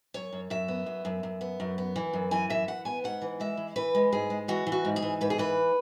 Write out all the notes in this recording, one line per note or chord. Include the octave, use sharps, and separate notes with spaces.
F#2 C#5
F#2
F#2 E5
B3
F#2
F#2
F#2
B3
F#2
B3
E3
F#2
E3 G#5
F#2 E5
E3 F#5
B3 G#5
G#2 F#5
E3
G#3 E5
E3
E3 B4
G#3
G#2 G#4
G#3
E3 F#4
E3
F#4
G#2
G#4
E3
G#2 B4
G#4
E3 B4